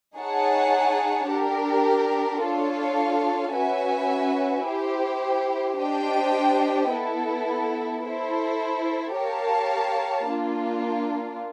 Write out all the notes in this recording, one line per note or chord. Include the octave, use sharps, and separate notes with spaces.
D#4 G#4 C#5 F#5 A5
D4 G4 A#4
D4 F4 A4 C#5 F5
C#4 F#4 B4 E5 G#5
E4 G4 C5
D4 G4 C5 D#5 G5
B3 E4 A4
E4 A4 C5
G4 A#4 C#5 F5 A5
A#3 D4 F4